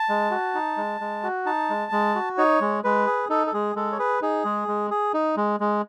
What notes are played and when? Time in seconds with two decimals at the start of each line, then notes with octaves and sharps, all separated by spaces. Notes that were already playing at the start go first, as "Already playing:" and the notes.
Already playing: A5
0.09 G#3
0.31 F#4
0.54 D#4
0.77 G#3
1.01 G#3
1.23 F#4
1.46 D#4 A5
1.70 G#3
1.92 G#3
2.15 F#4
2.38 D#4 C#5
2.61 G#3
2.84 G#3 B4
3.06 G#4
3.29 D#4 A4
3.47 A4
3.54 G#3 G#4
3.76 G#3 A4
3.92 C#5
3.98 G#4 B4
4.22 D#4 G#4
4.45 G#3
4.68 G#3
4.91 G#4
5.14 D#4
5.37 G#3
5.60 G#3